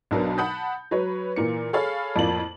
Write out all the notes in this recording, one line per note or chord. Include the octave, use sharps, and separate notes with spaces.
B1 B2 F#3 D4 A#4
F#5 A5 B5 D#6 G6
F#3 B4 C#5
A#2 E3 A#3 C#7
G#4 A4 C#5 F5 B5
F2 A2 A#3 F4 D5 F#7